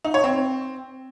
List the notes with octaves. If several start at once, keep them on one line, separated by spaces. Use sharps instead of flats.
D#4
C#5
C4